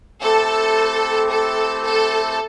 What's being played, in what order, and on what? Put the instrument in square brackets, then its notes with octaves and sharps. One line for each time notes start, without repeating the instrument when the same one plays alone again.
[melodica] A3 C4 E4 G4 [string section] A4
[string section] A4
A4